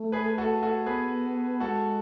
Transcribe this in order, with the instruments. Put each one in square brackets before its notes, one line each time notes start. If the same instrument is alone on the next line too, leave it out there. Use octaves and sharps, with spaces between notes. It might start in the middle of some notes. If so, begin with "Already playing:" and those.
Already playing: [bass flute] A3
[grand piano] G#4 B4
F#4 A4
F#4 A4
[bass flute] B3 [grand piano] G#4 B4
[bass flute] G#3 [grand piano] F#4 A4